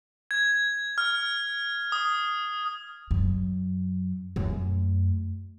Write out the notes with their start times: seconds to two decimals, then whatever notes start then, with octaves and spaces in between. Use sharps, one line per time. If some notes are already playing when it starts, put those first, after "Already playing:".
0.31 G#6
0.98 F6
1.92 D#6
3.11 F#2
4.36 F#2 A3